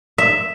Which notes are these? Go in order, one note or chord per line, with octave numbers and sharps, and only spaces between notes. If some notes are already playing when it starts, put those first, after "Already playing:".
E5